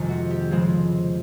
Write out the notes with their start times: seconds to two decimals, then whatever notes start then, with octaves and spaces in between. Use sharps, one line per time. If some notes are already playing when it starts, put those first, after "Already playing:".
Already playing: F2 C3 D#3 G#3
0.09 F#4
0.31 G4
0.51 C#3 F3 G#3 C4 G#4